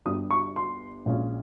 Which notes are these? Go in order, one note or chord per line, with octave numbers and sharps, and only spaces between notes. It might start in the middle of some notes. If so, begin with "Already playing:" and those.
G1 G2 G3 D#6
C#6
C6
A#1 A#2 G#3 C#4